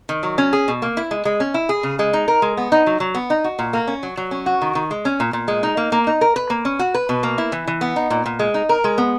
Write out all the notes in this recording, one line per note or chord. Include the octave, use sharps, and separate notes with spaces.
D#3
F#3
C#4
G#4
B2
A#3
E4
G#3
G#3
C#4
E4
G#4
C#3
G#3
D#4
A#4
G#3
B3
D#4
F#3
F#3
B3
D#4
F#4
A#2
A#3
C#4
F#3
F#3
C#4
F#4
D#3
D#3
G#3
C#4
A#2
A#2
G#3
D#4
A#3
A#3
D#4
A#4
B4
A#3
C#4
F#4
B4
B2
A#3
E4
E3
E3
B3
D#4
A#2
A#2
G#3
D#4
A#4
G#3
B3